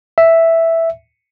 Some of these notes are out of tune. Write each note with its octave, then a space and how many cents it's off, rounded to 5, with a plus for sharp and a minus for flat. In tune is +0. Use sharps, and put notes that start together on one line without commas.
E5 +0